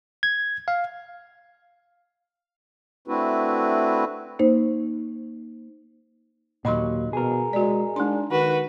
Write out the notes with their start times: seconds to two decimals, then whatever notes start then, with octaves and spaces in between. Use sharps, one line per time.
0.23 G#6
0.68 F5
3.08 A3 C4 D4 E4 F#4 B4
4.39 A#3 D#4 C5
6.65 D#2 A#2 F#3 D#5 B5 C6
7.13 B2 G#4 A#4
7.53 G#3 F#4 D5
7.96 G#3 D4 D#4 C6
8.31 D#3 F#4 B4